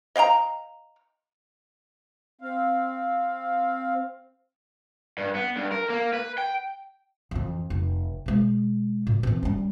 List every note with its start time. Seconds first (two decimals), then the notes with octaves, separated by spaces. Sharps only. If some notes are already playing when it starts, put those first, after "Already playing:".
0.16 D#5 F5 G5 A#5
2.41 C4 F5
5.18 G2
5.35 B3
5.56 G2
5.72 A#4
5.90 A#3
6.13 B4
6.38 G5
7.31 F2 E3
7.70 F1
8.26 B2 G#3
9.07 A#2
9.23 E3 C4
9.43 G3 C#4